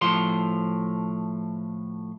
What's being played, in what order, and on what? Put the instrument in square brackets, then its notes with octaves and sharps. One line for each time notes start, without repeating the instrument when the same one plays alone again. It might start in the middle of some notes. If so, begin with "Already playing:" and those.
[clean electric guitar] A2 F3 C6